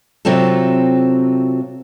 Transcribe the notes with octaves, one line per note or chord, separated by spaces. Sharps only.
C3 F#3 C4 F4 A4